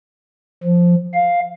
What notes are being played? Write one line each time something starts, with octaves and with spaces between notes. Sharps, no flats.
F3
F5